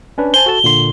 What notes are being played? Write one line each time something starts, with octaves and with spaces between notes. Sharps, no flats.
C#4 D4 B4
C5 G#5 A5 G7
F#4 A4 A5
A#2 D3 C6